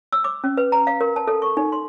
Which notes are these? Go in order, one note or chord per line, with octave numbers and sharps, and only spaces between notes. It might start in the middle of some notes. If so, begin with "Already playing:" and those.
E6
D6
C#4
B4
A#5
F5
A#4
A5
A4
C#6
D#4
C6